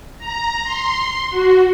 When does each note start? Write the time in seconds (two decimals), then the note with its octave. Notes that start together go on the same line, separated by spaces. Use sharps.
0.18 A#5
0.63 C6
1.30 F#4